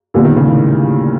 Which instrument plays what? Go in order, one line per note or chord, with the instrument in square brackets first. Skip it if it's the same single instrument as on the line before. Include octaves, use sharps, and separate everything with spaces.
[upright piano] A#2 G3 B3 [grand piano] D3
[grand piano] D#3
C#3
A2